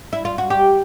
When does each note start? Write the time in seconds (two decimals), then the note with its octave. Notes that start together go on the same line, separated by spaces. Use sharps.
0.13 E4
0.25 F4
0.38 F#4
0.50 G4